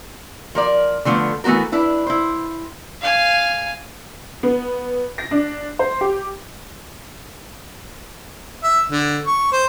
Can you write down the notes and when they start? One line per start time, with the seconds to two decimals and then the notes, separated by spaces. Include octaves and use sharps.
0.55 F3 A#4 D5
1.05 D3 F3 A3 B3
1.44 E3 A3 B3 F#4 A#4
1.72 D4 E4 B4
2.07 E4 C5
3.01 F5 G#5
4.43 B3
5.18 A#6
5.31 D4
5.79 C5
6.01 G4
8.63 E5
8.91 D3
9.26 C#6
9.52 C5